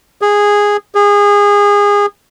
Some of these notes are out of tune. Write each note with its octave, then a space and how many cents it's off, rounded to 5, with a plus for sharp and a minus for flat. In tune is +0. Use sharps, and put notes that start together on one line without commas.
G#4 -10
G#4 -25